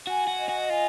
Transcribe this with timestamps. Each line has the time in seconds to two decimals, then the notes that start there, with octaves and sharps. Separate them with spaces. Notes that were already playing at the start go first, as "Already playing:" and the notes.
0.06 F#4 G#5
0.27 F#4
0.38 D#5
0.49 F#4
0.69 F4 G#5